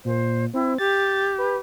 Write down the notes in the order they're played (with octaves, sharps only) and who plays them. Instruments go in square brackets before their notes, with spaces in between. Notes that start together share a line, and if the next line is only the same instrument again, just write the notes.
[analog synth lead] A#2 [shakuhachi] C5
[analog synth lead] C4 [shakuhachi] E4
[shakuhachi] G4 [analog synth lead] A6
[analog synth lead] B4